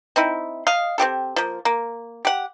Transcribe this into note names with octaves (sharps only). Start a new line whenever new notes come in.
C4 D#4 E4
D#5 F5
C4 F4 G4 A4
F3 A#3
A#3
G4 F#5